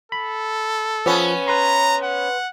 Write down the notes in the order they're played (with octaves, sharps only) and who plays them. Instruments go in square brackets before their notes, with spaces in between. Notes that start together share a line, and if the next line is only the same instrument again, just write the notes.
[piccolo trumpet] A4 [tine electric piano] B5
[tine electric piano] F3 [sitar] B3 C#4
[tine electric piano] B4 C6 [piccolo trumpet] A#5
[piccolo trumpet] F#5